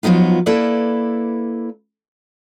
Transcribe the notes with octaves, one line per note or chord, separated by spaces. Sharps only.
F3 F#3 B3 D#4 F4
A#3 E4 A4 B4 D5